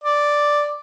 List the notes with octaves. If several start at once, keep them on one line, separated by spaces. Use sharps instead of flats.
D5